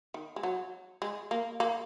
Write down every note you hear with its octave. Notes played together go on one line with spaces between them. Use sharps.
D#3
G#3
F#3
G#3
A#3
A#3